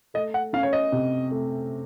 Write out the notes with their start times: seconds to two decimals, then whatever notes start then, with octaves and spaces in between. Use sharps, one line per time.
0.14 A3 D#5
0.34 F#5
0.53 C#4 F5
0.63 C#5
0.73 D#5
0.92 C3
1.31 A3